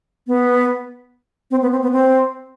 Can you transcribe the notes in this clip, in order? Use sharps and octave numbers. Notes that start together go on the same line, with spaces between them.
B3
C4
B3
C4
B3
C4